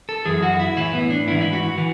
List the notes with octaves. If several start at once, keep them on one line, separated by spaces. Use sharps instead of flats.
A4
F#2 E3 G#4
F#4
E4
A2 E3 E4
B3
D4
G#2 E3 E4
E4
F#4
E3